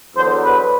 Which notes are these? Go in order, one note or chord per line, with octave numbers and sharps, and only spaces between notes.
E2 D3 F#3 C5
B4